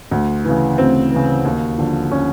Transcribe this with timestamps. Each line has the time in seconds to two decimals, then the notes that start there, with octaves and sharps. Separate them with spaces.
0.11 D2
0.45 C#3 E3
0.78 D2 C4
1.11 C#3 E3
1.45 D#2
1.78 D3 F3
2.12 C#4